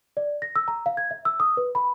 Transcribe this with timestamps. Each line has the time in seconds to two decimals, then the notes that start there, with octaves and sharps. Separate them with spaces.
0.17 D5
0.42 A#6
0.56 E6
0.68 A#5
0.86 F5
0.97 G#6
1.11 E5
1.25 E6
1.40 D#6
1.57 B4
1.75 B5